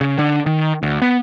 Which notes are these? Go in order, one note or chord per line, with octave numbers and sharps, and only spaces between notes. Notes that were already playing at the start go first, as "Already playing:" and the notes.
C#3
D3
D#3
D2
B3